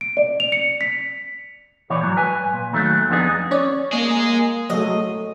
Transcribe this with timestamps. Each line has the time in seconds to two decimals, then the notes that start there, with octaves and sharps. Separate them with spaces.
0.01 D7
0.17 D5
0.40 F7
0.52 C#7
0.81 B6
1.90 A#2 E3 C#5 D5
2.01 G#2 F#3
2.17 B4 G#5
2.53 A#2
2.73 D#2 D#3 F#3 A3
3.10 F2 B3 D4 D#4 G4 G#4
3.51 C#4 C#5 D5
3.93 A#3 G#4 D#5
4.70 F#3 G#3 A3 D#5